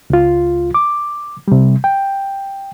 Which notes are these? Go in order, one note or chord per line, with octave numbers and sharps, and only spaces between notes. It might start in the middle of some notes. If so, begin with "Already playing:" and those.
C#2 F4
D6
C3 G3
G5